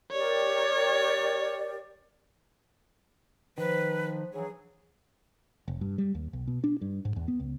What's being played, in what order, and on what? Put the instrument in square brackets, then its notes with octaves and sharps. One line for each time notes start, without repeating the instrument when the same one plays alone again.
[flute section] G4 A#4 D5 [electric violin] C#5
[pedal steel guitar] D#3 [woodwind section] F3 [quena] B4
[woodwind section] G2 E3 F#3 [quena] G#4
[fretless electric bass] F1
G2
G3
D#2
B1
B2
D4
G2
G#2
E2
B3
C#2